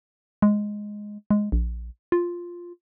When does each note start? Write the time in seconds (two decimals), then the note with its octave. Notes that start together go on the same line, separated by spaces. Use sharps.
0.42 G#3
1.31 G#3
1.52 A#1
2.12 F4